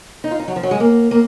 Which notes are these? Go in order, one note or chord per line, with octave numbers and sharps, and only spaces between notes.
D#4
F4
D#4
F#3
F3
F#3
G#3
A#3
A#3